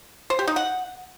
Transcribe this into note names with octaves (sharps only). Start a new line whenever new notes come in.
C5
G4
D#4
F#5